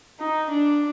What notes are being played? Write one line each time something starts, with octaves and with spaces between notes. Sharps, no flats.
D#4
D4